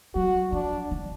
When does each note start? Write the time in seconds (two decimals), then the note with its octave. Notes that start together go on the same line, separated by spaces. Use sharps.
0.15 F#3 F#4
0.52 F3 D4
0.91 D#3